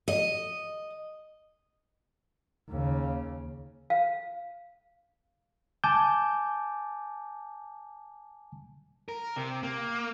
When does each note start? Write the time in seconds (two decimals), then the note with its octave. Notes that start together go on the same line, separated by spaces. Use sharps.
0.08 D#5
2.69 D#2 C#3
3.90 F5
5.84 G#5 A5 D6 G6
9.09 A#4
9.36 C3
9.63 A#3